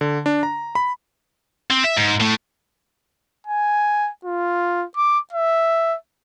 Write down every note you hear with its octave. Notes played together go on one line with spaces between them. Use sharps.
D3
D4
A#5
B5
C4
E5
G#2
A2 A3
G#5
F4
D6
E5